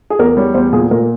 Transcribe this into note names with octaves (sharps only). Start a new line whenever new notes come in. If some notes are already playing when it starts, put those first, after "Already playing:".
G#4
E2 A#4
G3 C#5
E2 C5
A#2 G#4
A#2 A#4